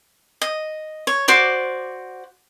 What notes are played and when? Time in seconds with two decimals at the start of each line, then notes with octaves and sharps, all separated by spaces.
0.42 D#5
1.07 C#5
1.28 F#4 C5 D5 D6